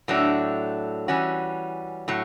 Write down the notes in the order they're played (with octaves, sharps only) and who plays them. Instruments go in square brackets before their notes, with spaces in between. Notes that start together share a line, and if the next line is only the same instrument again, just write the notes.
[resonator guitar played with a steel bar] A2 F#3 A3 D4
E3 G3 C#4 F#4
A2 F#3